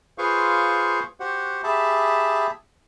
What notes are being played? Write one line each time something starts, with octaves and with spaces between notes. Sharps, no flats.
F4 G#4 B4 C5 F5 C#6
F#4 G4 C5 F#5
G4 G#4 E5 A5 B5